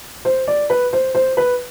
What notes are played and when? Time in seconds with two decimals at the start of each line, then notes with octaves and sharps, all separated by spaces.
0.25 C5
0.47 D5
0.70 B4
0.93 C5
1.15 C5
1.37 B4